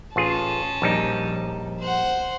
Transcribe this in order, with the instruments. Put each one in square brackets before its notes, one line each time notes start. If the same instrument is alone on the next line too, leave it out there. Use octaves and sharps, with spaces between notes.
[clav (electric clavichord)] A1 F4 G#4 [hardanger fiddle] C#4 A5
[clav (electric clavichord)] A#1 G3 D#4
[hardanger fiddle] C5 F#5